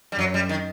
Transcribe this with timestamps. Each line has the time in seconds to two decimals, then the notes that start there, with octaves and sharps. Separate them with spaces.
0.12 G3
0.18 F#2 F#3
0.34 G3
0.49 D#3